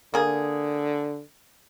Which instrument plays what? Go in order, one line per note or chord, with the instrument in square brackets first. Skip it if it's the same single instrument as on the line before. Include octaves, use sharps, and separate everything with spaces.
[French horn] D3 [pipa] A#3 G#4